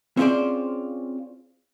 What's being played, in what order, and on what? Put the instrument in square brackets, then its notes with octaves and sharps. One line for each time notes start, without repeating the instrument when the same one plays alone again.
[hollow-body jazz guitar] C4 C#4 F4 G#4 C5 D5